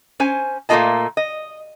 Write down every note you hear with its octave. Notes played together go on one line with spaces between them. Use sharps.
C#4 C5 G#5
A#2 A3 A#3 F4 D#5 A5
D#5